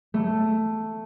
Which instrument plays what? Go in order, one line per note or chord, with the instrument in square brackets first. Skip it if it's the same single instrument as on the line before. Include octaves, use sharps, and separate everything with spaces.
[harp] A3